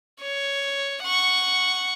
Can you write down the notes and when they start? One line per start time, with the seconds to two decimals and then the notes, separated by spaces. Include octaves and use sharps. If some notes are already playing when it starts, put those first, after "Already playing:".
0.21 C#5
1.04 F#5 C#6